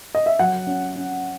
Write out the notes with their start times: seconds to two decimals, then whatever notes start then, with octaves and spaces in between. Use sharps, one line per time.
0.15 D#5
0.26 E5
0.39 F#3 F#5
0.67 C#4
0.96 C#4